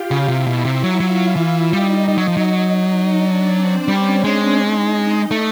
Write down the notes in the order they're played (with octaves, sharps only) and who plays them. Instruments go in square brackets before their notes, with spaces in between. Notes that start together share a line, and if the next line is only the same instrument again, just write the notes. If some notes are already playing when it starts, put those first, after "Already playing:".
Already playing: [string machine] F4 G4 F5 G5
[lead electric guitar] C#3
[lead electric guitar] C3 [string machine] E4 E5
[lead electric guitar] B2
C3
F#3
[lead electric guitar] F#3 [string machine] F4 F5
[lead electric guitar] E3 [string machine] E4 E5
[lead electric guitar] G3 [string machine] D#4 D#5
[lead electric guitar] G3 [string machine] D#4 D#5
[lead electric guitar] F#3
F3
F#3
[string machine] D4 D5
C4 C5
[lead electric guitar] G3 [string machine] C#4 C#5
[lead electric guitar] G#3
[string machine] D#4 D#5
[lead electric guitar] A3